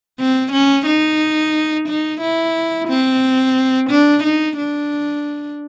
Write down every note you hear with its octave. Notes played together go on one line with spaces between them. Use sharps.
C4
C#4
D#4
D#4
E4
C4
D4
D#4
D4